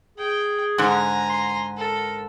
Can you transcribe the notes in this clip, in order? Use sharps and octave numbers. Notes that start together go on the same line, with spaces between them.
G#4 G5
G#2 D3 G#5 A#5
C6
A4 A#4